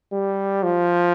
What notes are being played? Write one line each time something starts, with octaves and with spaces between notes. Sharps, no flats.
G3
F3